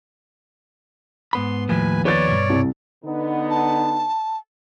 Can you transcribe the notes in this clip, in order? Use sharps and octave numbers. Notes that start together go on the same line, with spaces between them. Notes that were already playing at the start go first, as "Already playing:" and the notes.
G#2 B3 B5 C6
D#2 A2 F3 B4 G#5
B3 B4 C#5 D5 A6
G2 B2
C2
D3 B3 D#4
A5